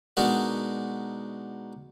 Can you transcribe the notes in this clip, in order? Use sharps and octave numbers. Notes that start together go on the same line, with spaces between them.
B2 G#3 D4 D#4 F#4 A#4